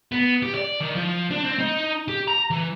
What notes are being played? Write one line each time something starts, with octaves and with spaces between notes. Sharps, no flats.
B3
G4
D5
D#3
F3
D4
C4
D#4
G4
A#5
E3